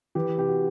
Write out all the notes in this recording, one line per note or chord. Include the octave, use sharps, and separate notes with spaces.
E3 G4
C3 G4
F#4